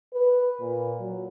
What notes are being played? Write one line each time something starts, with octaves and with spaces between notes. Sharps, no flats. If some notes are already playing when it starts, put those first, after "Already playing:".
B4
A#2
F#3